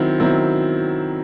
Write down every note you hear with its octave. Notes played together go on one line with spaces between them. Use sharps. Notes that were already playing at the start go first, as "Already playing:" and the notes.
Already playing: D#3 F#3 C4 E4
D#3 F#3 C4 E4